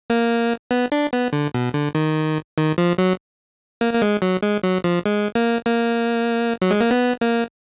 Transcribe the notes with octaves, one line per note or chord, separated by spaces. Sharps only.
A#3
B3
D4
B3
D3
B2
D3
D#3
D#3
F3
F#3
A#3
A#3
G#3
F#3
G#3
F#3
F3
G#3
A#3
A#3
F#3
G#3
A#3
B3
A#3